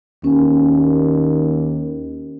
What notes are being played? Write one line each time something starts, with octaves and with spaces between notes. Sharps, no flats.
D#2 C#4